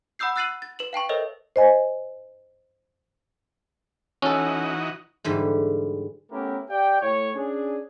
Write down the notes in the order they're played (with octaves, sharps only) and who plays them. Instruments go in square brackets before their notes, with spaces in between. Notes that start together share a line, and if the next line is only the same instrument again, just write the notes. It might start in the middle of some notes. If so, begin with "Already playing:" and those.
[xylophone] F#5 B5 D#6 E6 G6 C7
E6 F#6 A6 C7 D#7 F#7
A6
B4 E7 F#7
F5 G5 A5 C#6
A4 A#4 C5 C#5 D#5 E5
[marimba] C5 D#5 G#5
[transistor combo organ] E3 D#4 F#4 [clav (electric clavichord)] C#4 A4
[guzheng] G#2 D3 E3 G3
[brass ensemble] A3 B3 C#4 E4 G4 A#4
G4 D5 F5 G5
A2 C#5
C#4 D4 G#4